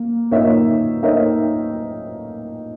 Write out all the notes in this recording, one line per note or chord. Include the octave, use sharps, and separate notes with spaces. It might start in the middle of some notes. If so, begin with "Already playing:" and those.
Already playing: A#3
A#3 D#4 A#4 C#5 E5
A#3 D#4 A#4 C#5 E5